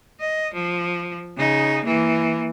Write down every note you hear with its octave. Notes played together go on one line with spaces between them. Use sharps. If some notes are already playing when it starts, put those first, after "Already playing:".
D#5
F3
C#3 D#4
E3 A#3